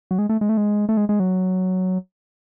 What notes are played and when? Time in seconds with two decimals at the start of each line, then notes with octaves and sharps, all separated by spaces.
0.11 F#3
0.19 G#3
0.29 A3
0.41 G#3
0.49 A3
0.57 G#3
0.89 A3
0.97 G#3
1.09 G#3
1.20 F#3